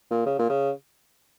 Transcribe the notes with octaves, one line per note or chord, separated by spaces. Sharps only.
A#2
C#3
A#2
C#3